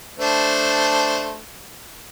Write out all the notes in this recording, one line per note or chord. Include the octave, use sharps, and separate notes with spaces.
A3 D4 C5